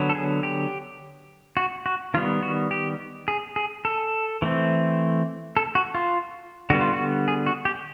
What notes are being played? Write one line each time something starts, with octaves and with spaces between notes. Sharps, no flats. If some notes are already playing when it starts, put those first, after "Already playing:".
Already playing: D3 F#3 B3
A4
G#4
G4
F#4
F#4
D#3 G3 B3 F4
F#4
G4
G#4
G#4
A4
E3 A3 C4
A4
F#4
F4
D3 G3 B3 F#4
F4
F#4
G#4
F#4
G4